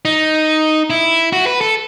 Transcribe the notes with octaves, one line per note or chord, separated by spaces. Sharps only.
D#4
E4
F#4
B4
A4